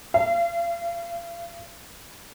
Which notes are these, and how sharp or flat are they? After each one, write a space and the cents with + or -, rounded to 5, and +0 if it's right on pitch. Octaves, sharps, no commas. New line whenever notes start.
F5 -40